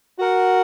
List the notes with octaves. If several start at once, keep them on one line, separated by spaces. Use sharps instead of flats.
F#4 A#4 F#5